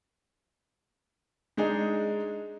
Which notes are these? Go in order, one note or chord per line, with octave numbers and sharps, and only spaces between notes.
G#3 D4 D#4 G#4